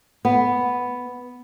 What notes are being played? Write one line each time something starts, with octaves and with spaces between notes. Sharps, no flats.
B3